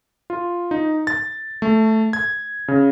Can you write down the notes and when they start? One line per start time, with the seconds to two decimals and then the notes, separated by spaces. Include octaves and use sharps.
0.30 F4
0.71 D#4
1.07 A6
1.62 A3
2.13 G#6
2.68 C#3